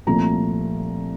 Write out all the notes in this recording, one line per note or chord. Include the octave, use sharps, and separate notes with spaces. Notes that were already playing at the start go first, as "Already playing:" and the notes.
C2 A#2 F3 A3 A#5